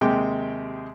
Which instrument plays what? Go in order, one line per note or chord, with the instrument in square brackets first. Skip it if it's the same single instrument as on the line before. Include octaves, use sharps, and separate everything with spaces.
[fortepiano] D#2 C3 G#3 G4 G#4 G5